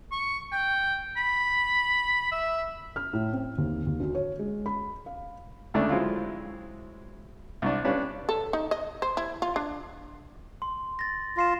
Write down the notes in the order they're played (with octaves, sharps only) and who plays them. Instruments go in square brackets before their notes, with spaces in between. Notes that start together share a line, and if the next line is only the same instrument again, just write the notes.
[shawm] C#6
G5
B5
E5
[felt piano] F6
A2
C4
D#2
D#2
D2
C#5
G#3
B5
F5
[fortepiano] D2 C#3 A3 D4
F#3 G#3 C4 E4 F4
C2 D4
C#4 D4 G4 B4 F5
[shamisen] A4
D#4
D#5
C5
E4
F4
D4
[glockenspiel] C6
A6 A#6
[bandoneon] F4 [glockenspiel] A#6 C7 E7